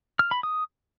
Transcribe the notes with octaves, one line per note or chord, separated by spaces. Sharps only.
F6
B5
D#6